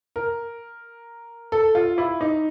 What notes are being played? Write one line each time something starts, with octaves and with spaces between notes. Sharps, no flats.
A#4
A4
F4
E4
D#4